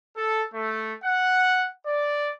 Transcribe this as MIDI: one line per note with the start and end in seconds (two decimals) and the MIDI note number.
0.16 0.42 69
0.54 0.95 57
1.04 1.68 78
1.86 2.30 74